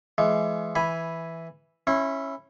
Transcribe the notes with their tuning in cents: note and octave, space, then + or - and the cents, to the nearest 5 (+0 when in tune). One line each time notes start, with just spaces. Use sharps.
E3 +35 G#3 +30
E3 +0 G#5 +0 B5 +0
C#4 -15 E4 +0 C6 +40